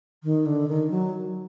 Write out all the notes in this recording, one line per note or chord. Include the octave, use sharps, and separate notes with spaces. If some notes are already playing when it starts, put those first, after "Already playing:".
D#3
D3
D#3
F#3